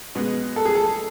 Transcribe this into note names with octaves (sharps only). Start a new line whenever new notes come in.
B2 G#3 B3
A4
G#4
A4